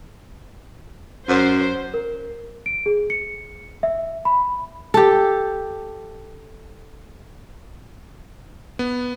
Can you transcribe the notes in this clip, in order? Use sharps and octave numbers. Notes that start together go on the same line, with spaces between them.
F#2 C5
A#4
D7
G#4
C#7
E5
B5
G4 A4
B3